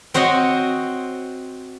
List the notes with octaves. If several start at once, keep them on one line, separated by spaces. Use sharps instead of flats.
C4 F#4 C5 C#5 D#5